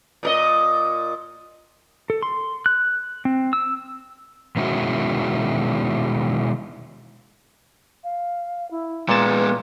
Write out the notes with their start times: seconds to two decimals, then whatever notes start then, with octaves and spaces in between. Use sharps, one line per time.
0.23 A#2 A#4 D#5
2.10 A4
2.22 C6
2.66 F#6
3.25 C4
3.53 E6
4.57 B2 D#3 G#3 C#4 E4 F#4
8.04 F5
8.71 E4
9.09 A#2 G#3 B3 B4 A5